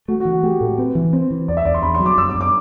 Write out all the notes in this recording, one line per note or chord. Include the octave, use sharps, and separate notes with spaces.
A3 F#4
F#4
E3
F#4
A3 G4
A2 A4
C4 B4
E3
C4 C5
E3
E2 D5
E5
E2 D5
C6
E2 B5
C6
F#3
D6
F#2 E6
D6
F#2
D6